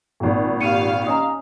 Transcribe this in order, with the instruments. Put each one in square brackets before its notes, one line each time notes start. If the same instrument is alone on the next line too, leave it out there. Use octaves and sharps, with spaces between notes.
[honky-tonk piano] G#1 A#2
[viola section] G4 F5 [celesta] C#7 D#7
[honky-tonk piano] C#4 D#5 [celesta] A#5 D#6